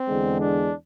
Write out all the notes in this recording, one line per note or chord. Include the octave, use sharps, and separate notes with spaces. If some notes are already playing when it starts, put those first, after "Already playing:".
Already playing: C4
E2 D3 G#3
D4